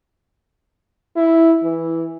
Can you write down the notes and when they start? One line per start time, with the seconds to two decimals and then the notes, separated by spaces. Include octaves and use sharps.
1.16 E4
1.63 E3